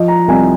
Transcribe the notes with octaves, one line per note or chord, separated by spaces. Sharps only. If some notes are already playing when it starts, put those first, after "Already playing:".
Already playing: F3 D#5
A#5
C2 G#5